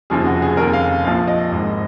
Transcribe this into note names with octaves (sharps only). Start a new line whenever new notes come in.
F1 D#2 C#3 F3 G#4
F#4
G#4
F1 D#2 C#3 A#4
F5
A#1 A#2 F3 F5
D#5
G#1 G#2 D#3